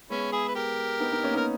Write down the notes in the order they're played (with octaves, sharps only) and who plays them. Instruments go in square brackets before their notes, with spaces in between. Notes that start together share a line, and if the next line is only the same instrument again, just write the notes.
[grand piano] G#3 B3 [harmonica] C#4 E4
[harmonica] E4 G#4
B4
G4 A#4
[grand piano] B3 D#4
B3 D#4
A#3 C#4
[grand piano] B3 D#4 [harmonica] A#4